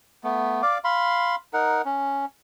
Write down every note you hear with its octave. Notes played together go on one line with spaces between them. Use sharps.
A3 B3
D5 F5 D6
F5 B5 C6
D#4 A#4 F#5
C#4